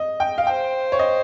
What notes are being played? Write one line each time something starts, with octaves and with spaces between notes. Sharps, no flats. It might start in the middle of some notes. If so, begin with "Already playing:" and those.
Already playing: D#5
G5
F5
C5 G5
C#5
D#5